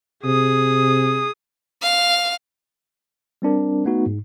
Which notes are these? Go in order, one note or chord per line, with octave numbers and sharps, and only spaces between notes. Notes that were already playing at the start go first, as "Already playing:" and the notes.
C3 G#4 D#6
F5
G3 C4 D4 A#4
A3 B3 D#4 F#4
G#2